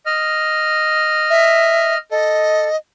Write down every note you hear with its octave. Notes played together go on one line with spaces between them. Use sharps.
D#5 F6
E5
A4 D#5